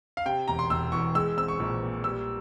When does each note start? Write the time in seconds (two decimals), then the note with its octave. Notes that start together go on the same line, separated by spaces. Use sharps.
0.17 F5
0.25 C3 G5
0.48 E1 A#5
0.59 C6
0.70 E1 E6
0.92 E2 C#6
1.15 G#3 E6
1.37 C4 E6
1.48 C#6
1.60 A#1
1.83 A#2
2.04 G3 E6